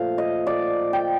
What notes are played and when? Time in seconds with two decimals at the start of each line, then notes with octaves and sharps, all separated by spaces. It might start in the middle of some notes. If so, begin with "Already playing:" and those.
Already playing: A#2 F3 A3 F5
0.18 D#5
0.47 D5
0.93 G5